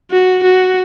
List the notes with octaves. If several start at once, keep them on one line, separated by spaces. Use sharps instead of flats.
F#4
F#4